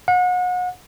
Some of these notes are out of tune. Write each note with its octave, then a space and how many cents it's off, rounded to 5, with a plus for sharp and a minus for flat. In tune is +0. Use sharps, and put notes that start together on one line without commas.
F#5 -35